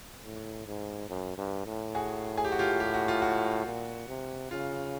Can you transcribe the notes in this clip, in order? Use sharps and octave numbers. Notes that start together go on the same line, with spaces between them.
A2
G#2
F#2
G2
A2
F#4 G#4
G#4
G4
F#4
F4 G4
G4
F#4
F4
F#4
A#2
C3
C#3 F4